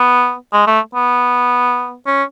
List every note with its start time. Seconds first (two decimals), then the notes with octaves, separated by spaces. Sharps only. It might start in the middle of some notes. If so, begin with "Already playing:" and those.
Already playing: B3
0.53 G#3
0.67 A3
0.95 B3
2.07 C#4